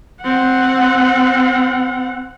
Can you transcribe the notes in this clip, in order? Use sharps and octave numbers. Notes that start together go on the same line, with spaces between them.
C4 F#5